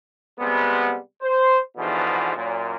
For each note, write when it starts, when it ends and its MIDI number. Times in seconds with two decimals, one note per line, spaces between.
0.38 0.96 48
0.38 0.96 55
0.38 0.96 56
0.38 0.96 59
1.21 1.58 72
1.77 2.35 40
1.77 2.35 44
1.77 2.35 47
1.77 2.35 50
1.77 2.35 52
1.77 2.35 53
2.35 2.76 42
2.35 2.76 46